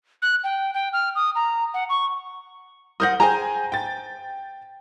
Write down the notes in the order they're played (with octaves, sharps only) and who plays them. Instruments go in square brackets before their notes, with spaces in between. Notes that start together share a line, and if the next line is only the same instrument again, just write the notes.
[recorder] F#6
G5
G5
F6
D#6
A#5
F#5
C#6
[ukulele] A#4 C5 F#5 [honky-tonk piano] D#6 G6 A#6
[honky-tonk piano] G#4 G5 G#5 [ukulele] C5 A#5
[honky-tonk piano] G5 A6